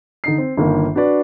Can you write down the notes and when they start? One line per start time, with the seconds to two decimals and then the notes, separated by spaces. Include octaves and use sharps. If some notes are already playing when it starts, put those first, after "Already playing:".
0.24 D3 D#4 C7
0.38 C4
0.57 G1 D#3 A#3
0.95 D4 F#4 B4 D5